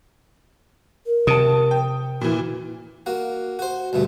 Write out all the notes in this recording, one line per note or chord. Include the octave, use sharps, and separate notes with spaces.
A#4
C3 A5 D#6
G5
A#2 E3 F#4
A#3 F#4
F#4 C5
D2 G2 B2 A3